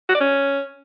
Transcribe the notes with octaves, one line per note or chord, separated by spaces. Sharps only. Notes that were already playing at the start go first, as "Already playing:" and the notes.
F#4
D5
C#4